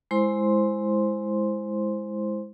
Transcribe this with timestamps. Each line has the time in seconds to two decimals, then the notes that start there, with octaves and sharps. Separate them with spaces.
0.11 G#3 E4 C5 C6